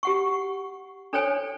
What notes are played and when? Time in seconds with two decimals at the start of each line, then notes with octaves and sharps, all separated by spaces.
0.03 G4 F#5 C#6
1.13 D4 A4 C5 C#5 G5 G#5